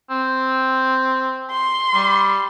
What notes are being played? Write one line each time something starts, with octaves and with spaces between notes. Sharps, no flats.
C4
C6
G3